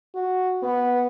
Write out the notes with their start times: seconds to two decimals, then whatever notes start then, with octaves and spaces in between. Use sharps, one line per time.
0.15 F#4
0.63 B3